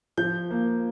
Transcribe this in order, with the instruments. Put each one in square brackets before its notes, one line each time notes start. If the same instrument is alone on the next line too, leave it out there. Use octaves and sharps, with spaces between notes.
[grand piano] F3 G6
A#3